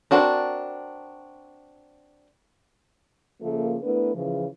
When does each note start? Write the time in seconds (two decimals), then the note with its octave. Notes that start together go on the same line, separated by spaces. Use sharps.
0.11 C4 D4 F#4 A#4
3.41 C#3 F3 A3 A#3
3.83 A3 B3 D4 E4 A#4 B4
4.15 C#3 E3 F3